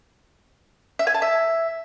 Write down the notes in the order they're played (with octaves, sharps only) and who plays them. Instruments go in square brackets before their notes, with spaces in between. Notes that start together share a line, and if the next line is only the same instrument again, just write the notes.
[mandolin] E5
G#5
A5
E5